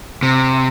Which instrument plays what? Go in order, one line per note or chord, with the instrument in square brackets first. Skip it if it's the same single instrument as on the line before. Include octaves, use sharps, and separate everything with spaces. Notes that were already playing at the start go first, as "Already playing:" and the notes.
[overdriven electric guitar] C3